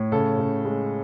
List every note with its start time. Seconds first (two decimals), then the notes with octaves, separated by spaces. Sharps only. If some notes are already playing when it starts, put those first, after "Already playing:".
Already playing: A2
0.12 C#3 A4
0.39 C#3
0.65 G#3